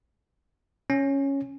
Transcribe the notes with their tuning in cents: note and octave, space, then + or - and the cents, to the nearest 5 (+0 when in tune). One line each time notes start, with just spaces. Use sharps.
C#4 -5